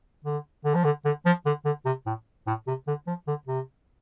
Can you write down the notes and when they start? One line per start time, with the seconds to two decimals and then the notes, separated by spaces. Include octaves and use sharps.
0.24 D3
0.65 D3
0.75 F3
0.84 D3
1.05 D3
1.26 F3
1.46 D3
1.65 D3
1.85 C3
2.06 A2
2.47 A2
2.67 C3
2.87 D3
3.07 F3
3.27 D3
3.47 C3